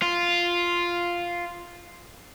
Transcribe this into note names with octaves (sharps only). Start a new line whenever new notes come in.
F4